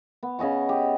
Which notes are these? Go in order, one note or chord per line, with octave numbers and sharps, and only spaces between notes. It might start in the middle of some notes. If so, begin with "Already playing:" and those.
B3
C#3 D#5 G#5 C#6
G4